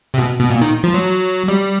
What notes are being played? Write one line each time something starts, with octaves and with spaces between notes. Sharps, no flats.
C3
B2
B2
A#2
D#3
F3
F#3
G3